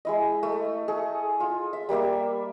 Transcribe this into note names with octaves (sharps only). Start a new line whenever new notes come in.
G#3 E4 D#5
A3
G#4 A4
F4
E5
G3 A#3 D5 E5